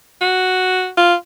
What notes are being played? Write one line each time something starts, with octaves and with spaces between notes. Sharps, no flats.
F#4
F4